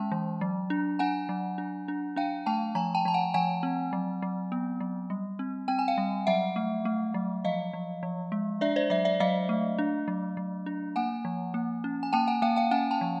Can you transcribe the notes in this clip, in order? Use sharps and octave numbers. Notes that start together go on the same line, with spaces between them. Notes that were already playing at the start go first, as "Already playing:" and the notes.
Already playing: G#3 C#4 G5 A5
E3
F#3
D4
D4 F#5 G#5
F#3
D4
D4
D4 F5 G5
A3 G5 A5
F3 G#5 A#5
G5 A5
F3 A5
F#5 G#5
F3 F#5 G#5
C4
F#3
F#3
B3
F#3
G3
C4
C4 G5
G#5
F5 G5
G3
F#3 E5 F#5
A3
A3
F#3
F3 D#5 F5
F3
F3
G#3
D4 D5 E5
C5 D5
F#3 D5 E5
D5 E5
F#3 D#5 F5
A3
D4
F#3
F#3
D4
A#3 F#5 G#5
F3
A#3
C#4
G#5
A#3 G5 A5
F#5 G#5
A#3 F5 G5
F5 G5
C#4 F#5 G#5
G5 A5
F3